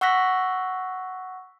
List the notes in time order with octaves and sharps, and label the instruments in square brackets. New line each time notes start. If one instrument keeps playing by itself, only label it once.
[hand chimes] F#5 C#6 E6 F#6 A#6 B6